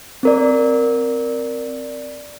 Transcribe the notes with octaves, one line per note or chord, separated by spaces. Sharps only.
C4 A#4 D5